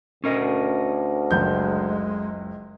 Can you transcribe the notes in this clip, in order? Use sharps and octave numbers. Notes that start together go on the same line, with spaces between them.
D2 C#4 A#4 D#5
F#1 C#2 G#3 G6